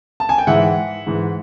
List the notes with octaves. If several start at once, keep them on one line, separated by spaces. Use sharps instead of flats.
A5
G#5
G5
G#2 E3 E5 F#5
G#2 E3